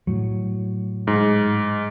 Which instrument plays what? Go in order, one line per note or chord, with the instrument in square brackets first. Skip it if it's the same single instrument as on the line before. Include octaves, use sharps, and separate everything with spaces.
[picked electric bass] A2 F#3
[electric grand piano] G#2